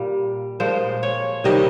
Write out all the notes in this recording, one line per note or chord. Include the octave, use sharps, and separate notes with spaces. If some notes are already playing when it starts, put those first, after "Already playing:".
Already playing: A#2 G3
A#2 F3 G#3 C5
C#5
C3 D#3 G3 D#5